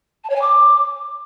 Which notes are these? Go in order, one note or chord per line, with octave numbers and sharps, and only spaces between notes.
A5
C#5
G#5
D6